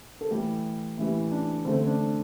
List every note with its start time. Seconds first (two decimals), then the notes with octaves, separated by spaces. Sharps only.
0.21 A4
0.31 A2 E3 G3 G4
0.98 A2 E3 G3
1.31 D4
1.64 D3 A3 C4
1.87 D4